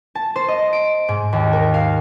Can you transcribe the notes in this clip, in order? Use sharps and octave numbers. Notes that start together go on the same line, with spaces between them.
A5
C5
D#5
D7
G#2
D#2
A#4
F5